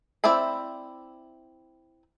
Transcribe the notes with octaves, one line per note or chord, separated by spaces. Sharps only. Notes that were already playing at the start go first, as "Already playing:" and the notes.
C4 E4 D5 E5 B5